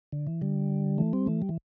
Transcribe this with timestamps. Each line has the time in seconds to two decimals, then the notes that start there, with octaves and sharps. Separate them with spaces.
0.12 D3
0.27 E3
0.41 D3 G3
0.98 E3 A3
1.13 G3 C4
1.26 E3 A3
1.42 G3
1.49 E3